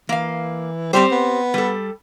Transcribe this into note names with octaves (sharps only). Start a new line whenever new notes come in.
E3 A#3 F5
G3 C4 G4 C5
B3
G3 A4